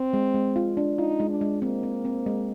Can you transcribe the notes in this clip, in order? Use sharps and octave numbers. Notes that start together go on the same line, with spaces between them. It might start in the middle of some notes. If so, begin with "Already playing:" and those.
Already playing: C4
G#3
G#3
F4
D4
D#4 F4
G#3
D4
G#3
A#3 C4
C4
C4
G#3